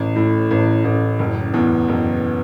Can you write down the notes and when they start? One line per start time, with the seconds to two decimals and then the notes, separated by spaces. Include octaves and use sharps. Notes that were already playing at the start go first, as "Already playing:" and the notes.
Already playing: A1
0.16 A2
0.51 A1
0.84 A1
1.19 F#1
1.54 E2
1.88 F#1